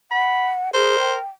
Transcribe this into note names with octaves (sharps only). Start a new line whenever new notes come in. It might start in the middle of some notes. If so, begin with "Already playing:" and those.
F#5 B5
G#4 A#4 C5
G5